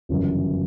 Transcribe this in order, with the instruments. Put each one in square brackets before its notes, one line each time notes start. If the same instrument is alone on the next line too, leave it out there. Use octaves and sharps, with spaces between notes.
[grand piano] G1 F#2 C#3 E3